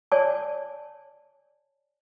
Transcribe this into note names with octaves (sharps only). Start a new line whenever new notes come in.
C#5 D5 G#5 A5